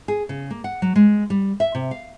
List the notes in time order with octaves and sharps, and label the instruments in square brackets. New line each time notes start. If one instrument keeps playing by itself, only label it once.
[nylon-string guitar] G#4
C#3
A#3
F#5
F#3
G#3
G3
E5
C3
F5